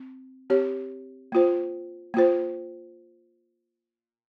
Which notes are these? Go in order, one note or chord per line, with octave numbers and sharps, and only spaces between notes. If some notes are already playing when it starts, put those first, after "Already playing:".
Already playing: C4
C4 G4 C#5
A#3 F4 C5
A#3 F4 C5